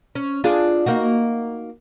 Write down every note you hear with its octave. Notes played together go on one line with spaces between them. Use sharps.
C#4
D4 F4 G#4
A#3 D#4 F#4